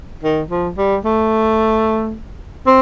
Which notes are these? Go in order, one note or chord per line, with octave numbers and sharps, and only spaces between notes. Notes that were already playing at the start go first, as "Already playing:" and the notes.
D#3
F3
G3
A3
C4